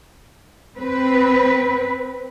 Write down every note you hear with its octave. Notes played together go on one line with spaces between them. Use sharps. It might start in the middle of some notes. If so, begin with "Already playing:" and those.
C4 B4